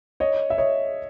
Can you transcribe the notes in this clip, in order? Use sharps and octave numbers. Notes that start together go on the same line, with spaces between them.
C#5 D#5
E5
C#5 D#5